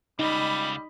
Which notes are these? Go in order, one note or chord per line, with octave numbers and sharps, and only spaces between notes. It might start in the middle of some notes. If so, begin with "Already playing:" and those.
C#2 G3 D#4 D#5 B5